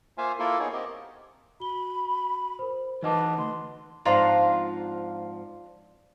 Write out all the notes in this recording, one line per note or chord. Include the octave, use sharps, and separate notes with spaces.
A#3 F4 C5 E5 F5 G#5
A#3 E4 F4 A4 A#4
B3 D#4 G#4 C#5
C4 G4 A#4 D#5
F#4 B5 G7
A#4 C5
E3 D#4 B4 D#5 F#5 A5 D6
D2 C6
G#2 F3 C4 D4 F4 A#5